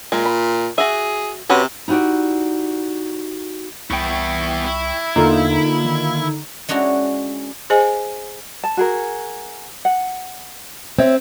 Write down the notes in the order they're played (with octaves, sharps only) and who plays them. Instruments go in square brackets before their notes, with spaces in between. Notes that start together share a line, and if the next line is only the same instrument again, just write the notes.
[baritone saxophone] A#2 [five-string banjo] G#3
[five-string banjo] B5
[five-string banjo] F#4 E5 [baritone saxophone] G#4
[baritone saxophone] C3 [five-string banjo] C#4 F#4 B4
[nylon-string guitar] D#4 E4 F#4 G4 D5
[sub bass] C2 [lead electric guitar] B3 E4 [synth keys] G5 C#6
[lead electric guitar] E4
[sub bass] E2 [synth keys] D3 D#4 [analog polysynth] A#3 F4
[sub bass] D#3
[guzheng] G#3 C#4 D4 E4 F#4
[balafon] G#4 C5 D#5 G#5
[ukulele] A5
F#4 G#4 A#4
F#5
[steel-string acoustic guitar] C4 [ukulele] C#5 E5